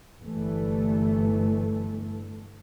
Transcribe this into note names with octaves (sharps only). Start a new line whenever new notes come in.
G1 E3 A3